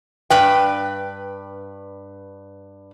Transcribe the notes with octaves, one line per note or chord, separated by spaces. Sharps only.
G2 B4 G5